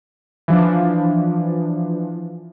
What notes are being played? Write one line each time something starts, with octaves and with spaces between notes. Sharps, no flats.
E3 F3 D4